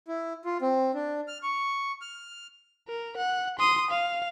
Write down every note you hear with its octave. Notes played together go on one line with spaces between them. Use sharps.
E4
F4
C4
D4
F6
C#6
F6
A#4
F#5
C6 D#6
F5